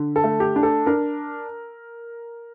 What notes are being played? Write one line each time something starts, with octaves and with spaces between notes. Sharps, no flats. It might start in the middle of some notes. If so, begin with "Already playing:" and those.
Already playing: D3
A4
A3
G4
D4
A4
D4 A#4